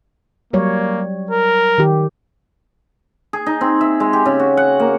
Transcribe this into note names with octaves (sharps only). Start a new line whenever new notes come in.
F#3 G3 A#3 C#5
A#4
D#3 G4
G#4
D#4
C4
E5
G#3
G4
C#3
F#4
F#5
A#3